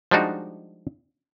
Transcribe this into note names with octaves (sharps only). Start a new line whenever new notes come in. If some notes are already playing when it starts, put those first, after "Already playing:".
F3 G3 G#3 D4 D#4 F#4